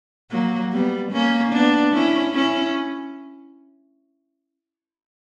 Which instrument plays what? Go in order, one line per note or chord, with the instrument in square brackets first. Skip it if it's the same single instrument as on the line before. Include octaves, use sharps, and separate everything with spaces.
[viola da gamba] F#3 A#3
G3 B3
A#3 C#4
B3 D4
C#4 E4
C#4 E4